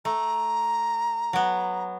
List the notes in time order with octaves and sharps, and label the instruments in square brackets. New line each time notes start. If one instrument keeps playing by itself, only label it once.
[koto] A3 [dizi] A#5
[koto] F#3 B3